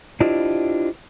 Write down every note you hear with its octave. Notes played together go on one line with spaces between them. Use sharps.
D4 E4 F4 G4 C5 D#5